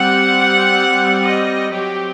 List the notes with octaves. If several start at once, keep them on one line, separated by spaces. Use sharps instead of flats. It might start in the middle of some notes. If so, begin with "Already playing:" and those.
Already playing: G3 C4 F#5
D#5
F#3 C4 G4